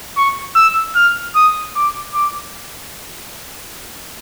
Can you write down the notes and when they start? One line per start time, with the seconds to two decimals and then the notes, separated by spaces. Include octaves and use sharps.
0.17 C#6
0.55 E6
0.95 F6
1.35 D#6
1.75 D6
2.14 D6